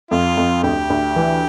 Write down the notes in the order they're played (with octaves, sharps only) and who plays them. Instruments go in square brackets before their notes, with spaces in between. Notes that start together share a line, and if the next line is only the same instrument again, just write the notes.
[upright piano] F2 [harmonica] F4
[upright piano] F2
[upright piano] D2 [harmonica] G4
[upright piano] D2
E3